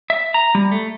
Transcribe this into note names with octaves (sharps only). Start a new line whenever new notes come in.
E5
A#5
G3
A3